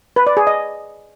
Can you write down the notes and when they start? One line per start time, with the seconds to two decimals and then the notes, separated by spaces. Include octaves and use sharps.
0.16 B4
0.27 D5
0.37 G#4
0.47 D#5